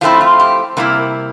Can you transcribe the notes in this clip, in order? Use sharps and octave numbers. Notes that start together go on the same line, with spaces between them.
F3 A3 C4 E4 F4
F4
G4
C3 G3 A#3 E4 A#4